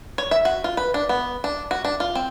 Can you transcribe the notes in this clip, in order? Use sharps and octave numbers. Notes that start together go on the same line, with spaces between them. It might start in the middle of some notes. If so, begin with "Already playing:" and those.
C#5
E5
F#4
F4
B4
D4
B3
D4
F#4
D4
F4
C4